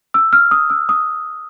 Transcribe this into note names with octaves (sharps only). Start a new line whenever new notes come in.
E6
F6
D#6
E6
D#6